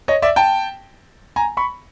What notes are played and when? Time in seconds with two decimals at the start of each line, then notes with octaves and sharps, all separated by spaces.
0.08 C#5 D#5
0.22 D5 E5
0.36 G5 A5
1.36 G#5 A#5
1.57 B5 C#6